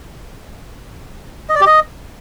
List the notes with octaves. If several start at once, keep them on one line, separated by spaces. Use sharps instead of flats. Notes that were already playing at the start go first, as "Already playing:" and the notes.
D#5
D5
G4
D#5